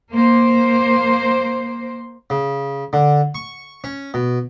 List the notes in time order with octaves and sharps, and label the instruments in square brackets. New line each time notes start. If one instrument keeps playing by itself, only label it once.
[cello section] A#3 C5
[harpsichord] C#3
D3
C#6
C#4
B2